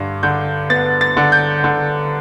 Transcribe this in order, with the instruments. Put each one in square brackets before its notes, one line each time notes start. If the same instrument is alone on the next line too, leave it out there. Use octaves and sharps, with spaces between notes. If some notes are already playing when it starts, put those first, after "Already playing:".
Already playing: [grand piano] G2 D3
D3 G6
B3 A6
A6
D3
G6
D3